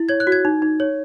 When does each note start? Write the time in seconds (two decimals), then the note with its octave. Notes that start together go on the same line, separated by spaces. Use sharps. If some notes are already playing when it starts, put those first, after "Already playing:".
Already playing: E4
0.09 C#5 G#6
0.20 F#6
0.27 F#4
0.32 G#6
0.45 D#4
0.62 D#4
0.80 C#5